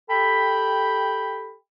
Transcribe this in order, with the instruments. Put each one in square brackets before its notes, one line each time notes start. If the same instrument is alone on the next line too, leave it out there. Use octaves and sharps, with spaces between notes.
[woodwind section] G4 A4 G5 B5